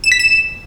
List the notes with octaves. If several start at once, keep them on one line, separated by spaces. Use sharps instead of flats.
E7
B6
E7